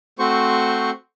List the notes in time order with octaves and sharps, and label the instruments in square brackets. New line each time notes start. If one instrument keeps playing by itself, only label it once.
[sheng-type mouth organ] A3 C4 F#4 C5 C#6